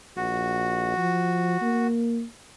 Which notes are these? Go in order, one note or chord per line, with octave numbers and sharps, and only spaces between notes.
A#1 F#4
F3
A#3